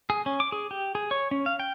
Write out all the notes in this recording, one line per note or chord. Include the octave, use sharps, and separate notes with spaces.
G#4
C#4
D6
G#4
G4
G#4
C#5
C#4
F5
G5